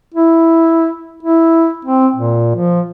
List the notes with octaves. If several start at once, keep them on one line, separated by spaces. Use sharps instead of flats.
E4
E4
C4
A#2
F3